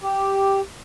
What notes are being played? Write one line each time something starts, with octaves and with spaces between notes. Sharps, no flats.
G4